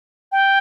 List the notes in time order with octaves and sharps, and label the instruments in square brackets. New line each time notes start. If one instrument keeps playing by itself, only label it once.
[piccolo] G5